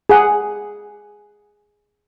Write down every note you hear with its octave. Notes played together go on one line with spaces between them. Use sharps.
G#4 F#5